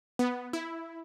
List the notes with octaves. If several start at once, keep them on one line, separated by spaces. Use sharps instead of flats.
B3
E4